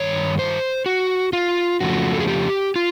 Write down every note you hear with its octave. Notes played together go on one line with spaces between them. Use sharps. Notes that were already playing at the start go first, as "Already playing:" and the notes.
Already playing: G2 D#3 C#5
C5
F#4
F4
F2 C#3 F3 A3 F#4
A4
G#4
G4
F4